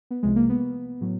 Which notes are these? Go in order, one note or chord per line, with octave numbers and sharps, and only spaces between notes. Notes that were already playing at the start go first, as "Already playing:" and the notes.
B3
C2 C3 F3 G#3
A#3
B3
A2 F#3